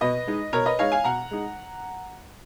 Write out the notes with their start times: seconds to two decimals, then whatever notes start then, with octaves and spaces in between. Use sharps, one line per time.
0.01 B2 B4 D#5
0.27 G#3 D#4
0.53 B2 A#4 C#5
0.65 B4 D#5
0.79 G#3 D#4 C#5 F5
0.92 F5 G#5
1.04 B2 F#5 A#5
1.31 G#3 D#4